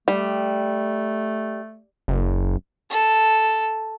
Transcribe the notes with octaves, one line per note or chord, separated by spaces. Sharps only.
G3 A3
F#1
A4